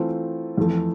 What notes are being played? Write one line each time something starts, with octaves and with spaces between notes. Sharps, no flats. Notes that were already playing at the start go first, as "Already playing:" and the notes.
Already playing: E3 A3 C4 F4
F2 E3 A3